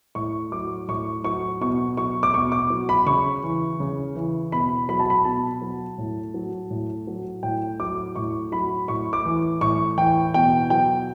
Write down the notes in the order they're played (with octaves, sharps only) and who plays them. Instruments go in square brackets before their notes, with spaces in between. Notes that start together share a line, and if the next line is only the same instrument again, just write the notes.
[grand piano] A2 C#6
F#3 D6
A2 C#6
F#3 C#6
B2 C#6
F#3 C#6
D6
B2 C#6
D6
F#3
B5
C#3 C#6
E3
C#3
E3
B2 B5
F#3 B5
A5
B5
B2 A5
F#3
A2
F#3
A2
F#3
A2 G5
F#3 D6
A2 C#6
F#3 B5
A2 C#6
D6
E3
A2 C#6
E3 G5
B2 G5
F#3 G5